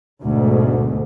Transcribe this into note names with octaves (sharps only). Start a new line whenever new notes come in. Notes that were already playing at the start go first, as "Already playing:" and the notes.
D2 G#2 B2